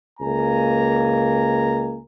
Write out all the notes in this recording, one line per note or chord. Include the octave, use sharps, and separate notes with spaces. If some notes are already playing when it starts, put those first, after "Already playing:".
C#2 A#3 G#5 A#5